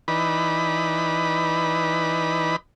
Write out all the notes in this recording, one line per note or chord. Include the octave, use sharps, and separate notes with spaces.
E3 D#4 B4 D5 B5